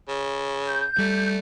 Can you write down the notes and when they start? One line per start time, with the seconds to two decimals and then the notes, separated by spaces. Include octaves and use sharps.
0.09 C#3
0.67 G6
0.98 G3 A3